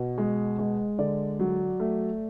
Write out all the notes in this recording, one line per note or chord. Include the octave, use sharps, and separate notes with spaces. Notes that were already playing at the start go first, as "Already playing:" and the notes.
Already playing: B2
G#3
G#3
D3 D5
F#3
A3